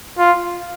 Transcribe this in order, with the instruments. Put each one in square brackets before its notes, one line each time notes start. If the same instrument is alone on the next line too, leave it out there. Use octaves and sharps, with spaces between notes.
[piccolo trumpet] F4